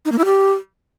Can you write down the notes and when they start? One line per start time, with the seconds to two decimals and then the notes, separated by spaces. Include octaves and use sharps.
0.05 D#4
0.12 A#3
0.18 E4
0.25 G4